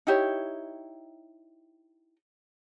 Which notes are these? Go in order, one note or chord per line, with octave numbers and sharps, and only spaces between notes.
D#4 E4 G4 C#5